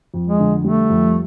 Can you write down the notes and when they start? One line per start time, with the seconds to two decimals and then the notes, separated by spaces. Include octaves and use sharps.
0.14 F2
0.27 G#3
0.39 D3
0.64 G3 A3
0.90 F2